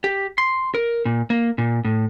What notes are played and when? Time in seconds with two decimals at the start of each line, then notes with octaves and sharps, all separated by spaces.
0.04 G4
0.38 C6
0.74 A#4
1.05 A#2
1.30 A#3
1.58 A#2
1.85 A2